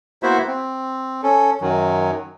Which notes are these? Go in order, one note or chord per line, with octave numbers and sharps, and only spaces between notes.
A#3 B3 E4 F#4 C5 E5
C4
C#4 A4
F#2 D#3 F#3